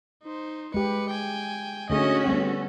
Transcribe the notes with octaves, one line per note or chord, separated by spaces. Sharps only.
D#4 C5
G#3 G4 B4 C#7
G5 G#5
D3 A3 C#4 F#4 G#4 D#5
G3 A3 B3 A4